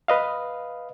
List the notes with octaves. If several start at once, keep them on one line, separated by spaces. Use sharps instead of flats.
B4 D#5 F5